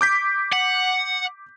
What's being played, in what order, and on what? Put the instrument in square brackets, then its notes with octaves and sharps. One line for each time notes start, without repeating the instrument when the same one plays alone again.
[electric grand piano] D6 G6 B6
[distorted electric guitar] F#5